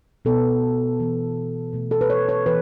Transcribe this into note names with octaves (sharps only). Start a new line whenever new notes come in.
B2 B3 A4
E3 B3
B2 A3
A4
B4
C#5
C#5
E3 B4